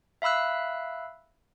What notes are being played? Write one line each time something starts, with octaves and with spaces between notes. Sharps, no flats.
E5 F5 B5 E6 F#6